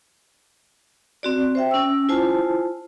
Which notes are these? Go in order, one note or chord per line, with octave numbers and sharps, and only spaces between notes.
C4 F#4 D5
C5 E5 G5
C#4 E6
E4 F4 C5 G#5 A5